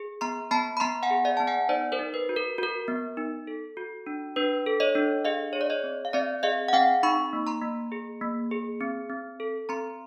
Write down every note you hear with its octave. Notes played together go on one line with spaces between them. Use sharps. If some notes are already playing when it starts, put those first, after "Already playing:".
Already playing: G#4
B3 A#5 C6
B3 A5 B5
B5
B3 A#5 C6
F#5 G#5
G#4
D5 E5
B3 A5
F#5 G#5
D#4 C5 D5
A#4 C5
D#4
B4
F#4
A#4
F#4 A#4
B3
D#4
A4
F#4
D4
D4 B4
A4
C#5 D#5
D4
G#4 D#5 F5
G#4 C#5
D5
C#5 D#5
C4
F5
C4 D5 E5
G#4 D#5 F5
F#5
C4 F5 G5
D#4 B5 C#6
A#3
A#5 C6
A#3
G#4
A#3
G#4
C4
C4
A4
C4 A#5 C6